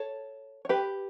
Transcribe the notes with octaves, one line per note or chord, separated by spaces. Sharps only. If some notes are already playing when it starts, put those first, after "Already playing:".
Already playing: A4 C#5
C#5
G4 B4